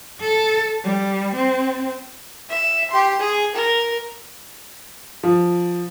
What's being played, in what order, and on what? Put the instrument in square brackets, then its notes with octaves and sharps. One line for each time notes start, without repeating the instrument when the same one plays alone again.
[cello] A4
G3
C4
[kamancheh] E5
G4 C6
G#4
A#4
[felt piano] F3